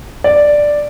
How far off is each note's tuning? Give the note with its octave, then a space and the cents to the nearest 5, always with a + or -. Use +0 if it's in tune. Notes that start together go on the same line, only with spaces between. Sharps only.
D5 +5